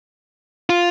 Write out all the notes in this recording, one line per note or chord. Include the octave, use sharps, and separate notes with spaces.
F4